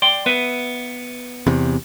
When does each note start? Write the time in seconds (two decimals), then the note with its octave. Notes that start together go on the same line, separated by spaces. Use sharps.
0.02 D5 G5 C6
0.26 B3 B4 E5
1.47 E2 C3